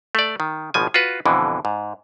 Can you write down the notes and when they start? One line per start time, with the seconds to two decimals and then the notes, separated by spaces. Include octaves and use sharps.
0.15 A3 D5
0.40 D#3
0.74 G#1 B2 F3 G#5
0.94 F4 F#4 B4
1.25 F2 B2 D3 E3
1.65 G#2